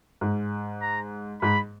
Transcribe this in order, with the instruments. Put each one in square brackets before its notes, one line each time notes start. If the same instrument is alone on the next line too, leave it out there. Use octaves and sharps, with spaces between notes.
[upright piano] G#2
[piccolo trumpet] A#5
[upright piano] G#2 [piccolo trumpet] B5